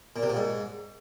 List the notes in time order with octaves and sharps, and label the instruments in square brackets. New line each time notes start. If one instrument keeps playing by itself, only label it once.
[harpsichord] A#2
C3
A#2
G#2